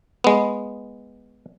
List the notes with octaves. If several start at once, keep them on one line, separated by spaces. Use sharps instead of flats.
G#3 B3